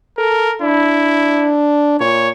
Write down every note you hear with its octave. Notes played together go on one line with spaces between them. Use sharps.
A4 A#4
D4 E4
A#2 C#5